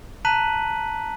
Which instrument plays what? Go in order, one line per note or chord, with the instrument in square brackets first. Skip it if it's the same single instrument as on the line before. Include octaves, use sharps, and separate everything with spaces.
[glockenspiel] A5 A#5 F#6 B6 D#7 F#7